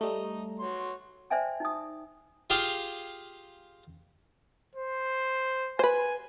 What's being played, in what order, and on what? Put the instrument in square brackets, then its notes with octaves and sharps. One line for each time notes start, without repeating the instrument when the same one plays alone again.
[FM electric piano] G3 A3 [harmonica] D#5 A#5
[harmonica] F#4 C#5 C6
[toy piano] C5 D5 E5 G5 G#5 A#5
D#4 D#6
[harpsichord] F4 G4 G#4 F5
[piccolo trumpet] C5
[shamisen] B4 C5 [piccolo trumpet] G#5